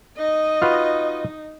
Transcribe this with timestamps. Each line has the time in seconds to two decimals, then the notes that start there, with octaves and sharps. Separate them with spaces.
0.18 D#4 D#5
0.62 F4 F#4 B4